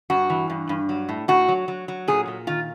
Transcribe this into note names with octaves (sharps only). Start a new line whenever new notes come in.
G2 F#4
E3
G2
G2
F#3
A2
A2 F#4
F#3
F#3
F#3
A#2 G#4
A#2
D#3 F4